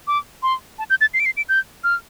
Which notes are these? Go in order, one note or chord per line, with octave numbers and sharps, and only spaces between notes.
D6
C6
A5
G6
A6
C7
D7
C7
D7
G6
F6